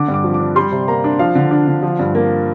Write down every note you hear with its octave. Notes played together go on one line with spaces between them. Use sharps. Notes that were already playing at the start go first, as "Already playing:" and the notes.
Already playing: D3 D6
G2
D6
F3
D6
D4
G3 C6
C3
A#3 A#5
D4
F3 F5
D3
D4
D3
F3
G2
A#3